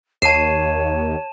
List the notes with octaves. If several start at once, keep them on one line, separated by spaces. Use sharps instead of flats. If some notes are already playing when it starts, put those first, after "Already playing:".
D#2 C#5 A5 C7 D#7 E7